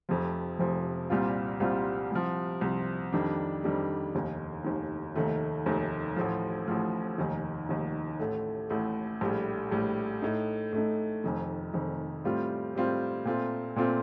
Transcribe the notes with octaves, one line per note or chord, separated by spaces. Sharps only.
F1 F2 C3 F3
F1 F2 C3 F3
C2 A#2 G3 C4 F4
C2 A#2 G3 C4 F4
C2 C3 F3
C2 C3 F3
F2 D#3 G3 D4
F2 D#3 G3 D4
F1 D#2 D#3
F1 D#2 D#3
F1 D#2 D#3 A3
F1 D#2 D#3 A3
A1 A2 F3
A1 A2 F3
F1 D#2 D#3
F1 D#2 D#3
A1 A2 A3
A1 A2 A3
A#1 A2 G3
A#1 A2 G3
A2 A3 D#4
A2 A3 D#4
F1 F2 D#3
F1 F2 D#3
A2 G3 C4 F4
A2 G3 C4 F4
A#2 A3 C4 F4
A#2 A3 C4 F4